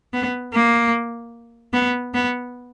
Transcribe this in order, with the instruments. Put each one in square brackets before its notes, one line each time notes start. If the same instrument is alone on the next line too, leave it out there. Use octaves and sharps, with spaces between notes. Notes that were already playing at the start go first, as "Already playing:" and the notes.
[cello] B3
A#3
B3
B3